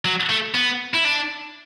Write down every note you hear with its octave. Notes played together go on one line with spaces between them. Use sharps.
F#3
A3
B3
E4
D4